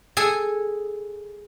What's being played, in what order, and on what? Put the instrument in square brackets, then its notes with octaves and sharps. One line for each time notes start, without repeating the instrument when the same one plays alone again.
[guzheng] G#4 A4 G#5